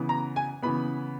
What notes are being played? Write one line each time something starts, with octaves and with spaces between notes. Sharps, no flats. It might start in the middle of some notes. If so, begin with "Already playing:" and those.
Already playing: C#3 E3 B3
A#5
G#5
C#3 E3 B3 B5